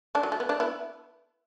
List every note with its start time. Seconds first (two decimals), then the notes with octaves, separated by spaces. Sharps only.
0.15 A3 D4
0.23 F#3
0.32 A3
0.40 B3
0.49 A3 D4
0.60 B3 E4